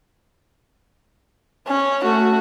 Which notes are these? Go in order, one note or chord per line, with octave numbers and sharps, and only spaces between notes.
C#4
A3 F#4